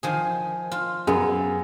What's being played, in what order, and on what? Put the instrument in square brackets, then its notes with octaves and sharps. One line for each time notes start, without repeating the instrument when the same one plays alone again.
[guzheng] D#3 F3 G#4
F4
[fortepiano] F#2 [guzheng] B3 [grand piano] G#4